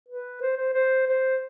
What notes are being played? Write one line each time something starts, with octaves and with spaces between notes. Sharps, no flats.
B4
C5
C5
C5
C5